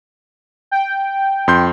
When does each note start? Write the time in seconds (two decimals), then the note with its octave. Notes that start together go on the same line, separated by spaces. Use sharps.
0.71 G5
1.48 F2 C6 G6